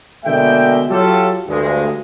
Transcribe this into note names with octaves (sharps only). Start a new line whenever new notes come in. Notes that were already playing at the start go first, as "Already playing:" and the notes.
B2 D3 G#3 A#3 E5 G5
F#3 F4 G4 A4
D2 G2 G#3